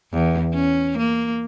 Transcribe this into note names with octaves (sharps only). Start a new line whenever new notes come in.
E2
C#4
A#3